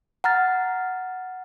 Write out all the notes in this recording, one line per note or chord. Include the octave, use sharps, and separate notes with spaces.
F#5 A#5 F6 A6